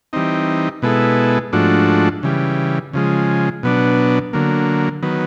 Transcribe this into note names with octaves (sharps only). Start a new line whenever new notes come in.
E3 G3 C4 D#4
B2 G#3 B3 E4 A4
G#2 F3 A3 D4 F#4
C#3 E3 G3
C#3 F3 G#3
B2 F#3 B3 D4
D3 F#3 A#3
D#3 F#3 B3